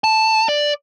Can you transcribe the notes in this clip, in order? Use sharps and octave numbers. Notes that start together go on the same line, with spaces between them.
A5
D5